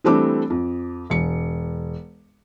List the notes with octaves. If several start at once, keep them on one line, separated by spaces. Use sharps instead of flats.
E3 G3 A3 C4 D4 D6
F2
E1 C#7